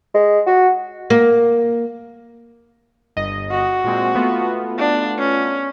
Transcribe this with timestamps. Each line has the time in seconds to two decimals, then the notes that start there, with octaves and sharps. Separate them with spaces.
0.14 G#3
0.46 F#4
1.10 A#3
3.17 G1 D#5
3.52 F#4
3.84 A#2 G#3 C4
4.15 A3 B3 F4
4.79 D4
5.19 C#4